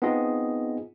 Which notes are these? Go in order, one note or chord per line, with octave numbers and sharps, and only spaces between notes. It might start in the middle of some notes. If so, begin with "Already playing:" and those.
B3 C4 D#4 F4 G#4 D#5